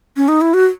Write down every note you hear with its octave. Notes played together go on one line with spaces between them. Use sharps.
C#4
D#4
E4
F#4